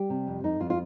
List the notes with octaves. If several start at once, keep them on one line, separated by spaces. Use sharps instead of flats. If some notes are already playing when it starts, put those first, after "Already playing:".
Already playing: G3 G4
C3
F2
F2 D#4
F2 F4
F4